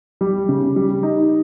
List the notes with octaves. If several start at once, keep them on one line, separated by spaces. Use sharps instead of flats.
G3
C#3
G3
D#4